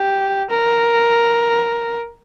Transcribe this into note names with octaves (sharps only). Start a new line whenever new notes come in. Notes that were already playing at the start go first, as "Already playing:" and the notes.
Already playing: G4
A#4